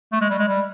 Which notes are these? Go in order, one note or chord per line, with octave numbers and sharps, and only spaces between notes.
A3
G#3
G3
G#3
G3